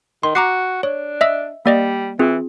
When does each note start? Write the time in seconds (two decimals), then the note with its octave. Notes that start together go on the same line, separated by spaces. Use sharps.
0.23 D#3 C6
0.35 F#4 A#5 D6 C7
0.83 D4 C#5
1.21 D#5 E5 E6
1.66 G3 A#3 D5 D#5
2.19 E3 C4 F4 G#4